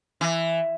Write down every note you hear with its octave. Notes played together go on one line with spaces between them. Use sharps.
E3